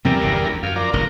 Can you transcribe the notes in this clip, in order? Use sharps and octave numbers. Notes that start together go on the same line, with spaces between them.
E2 C3 F3 G3 C4 A#4
G1 C#3
D2
F#2 F5
F3 A#4 D5
E1 A1 C#3 A#4